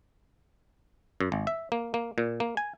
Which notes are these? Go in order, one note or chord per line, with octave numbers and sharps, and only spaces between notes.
F#2
G#1
E5
A#3
A#3
A#2
A#3
G#5